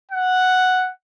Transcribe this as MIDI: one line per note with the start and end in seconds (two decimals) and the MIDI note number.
0.11 0.91 78